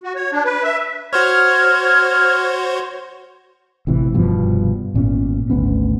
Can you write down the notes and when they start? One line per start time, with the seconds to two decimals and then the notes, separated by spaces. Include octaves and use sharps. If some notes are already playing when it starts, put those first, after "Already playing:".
0.04 F#4
0.16 C#5
0.32 D4
0.45 B4
0.64 E5
1.13 F#4 C5 C#5 F6 G#6
3.87 A1 C3 E3
4.13 F1 G2 B2 F3
4.94 G#1 A#2 B3 C#4
5.50 G#1 D2 B3 C#4